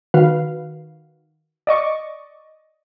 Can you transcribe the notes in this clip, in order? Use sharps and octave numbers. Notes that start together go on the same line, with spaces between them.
D#3 F#4 B4 F5
D5 D#5 C#6 D6